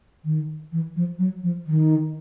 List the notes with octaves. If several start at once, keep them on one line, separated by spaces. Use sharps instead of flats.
D#3
E3
F3
F#3
F3
D#3